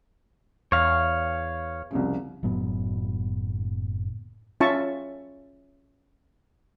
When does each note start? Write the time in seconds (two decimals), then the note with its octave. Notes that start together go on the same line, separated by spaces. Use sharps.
0.72 E2 C#5 F5
1.91 C2 F2 C#3
2.43 F#1 A2 F#3 B3
4.60 C#4 F4 E5 A5 C#6